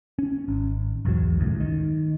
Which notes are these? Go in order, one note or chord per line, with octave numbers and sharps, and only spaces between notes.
C#4
G#1
B1 E2 G#2 F#3
G1 C#2 F#2 A2
D#3